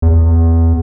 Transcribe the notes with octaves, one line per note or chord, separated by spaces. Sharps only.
E2